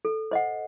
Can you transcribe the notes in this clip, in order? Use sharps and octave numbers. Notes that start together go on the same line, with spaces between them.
A4
C5 D#5 F#5